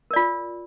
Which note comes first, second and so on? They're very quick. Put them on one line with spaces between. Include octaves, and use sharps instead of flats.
A#4 D5 F4